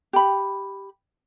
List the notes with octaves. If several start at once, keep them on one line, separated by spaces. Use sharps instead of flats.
G4 B5